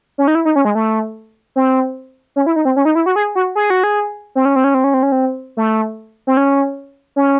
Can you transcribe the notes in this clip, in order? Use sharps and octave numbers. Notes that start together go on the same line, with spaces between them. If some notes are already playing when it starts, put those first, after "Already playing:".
C#4
D#4
E4
D#4
C#4
G#3
A3
C4
C#4
E4
D#4
C4
C#4
D#4
E4
F#4
G#4
F#4
G#4
F#4
G#4
C4
C#4
C4
C#4
C4
C#4
C4
C#4
C4
A3
C4
C#4
C#4